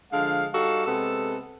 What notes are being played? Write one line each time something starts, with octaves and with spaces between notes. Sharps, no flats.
D3 F3 G#3 F5
G3 D#4 F#4 A4 F5
C3 G#3 B3 A4